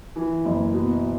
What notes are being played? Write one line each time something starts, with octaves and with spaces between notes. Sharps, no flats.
E3
F#1
B2